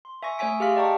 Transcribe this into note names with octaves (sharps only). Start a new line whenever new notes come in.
C6
E5 G#5 C#6 A#6
A3 C#5 E5 G#5 B6 D7
G4 G#4 F5 C6 F6 B6
D5 D#5 G5 A5 A#5 C#6